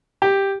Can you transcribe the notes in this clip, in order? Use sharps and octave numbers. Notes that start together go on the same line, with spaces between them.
G4